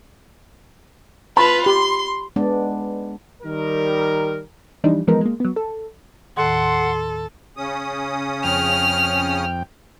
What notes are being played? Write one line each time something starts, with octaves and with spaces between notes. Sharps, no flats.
F4 B4 A5 B5
G4 C6
G#3 B3 D4 D5
D#3 G3 A#4
E3 F3 G3 D4 D#4
E3 F3 G#3 B3 D#4 A#4
G#3 A#3
F#3 B3
A4
D#2 A2 D#3 A4 F#5 C6
C#3 C#4 D#6
F2 G5 F6